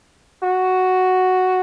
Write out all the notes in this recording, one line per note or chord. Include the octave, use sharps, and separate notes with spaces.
F#4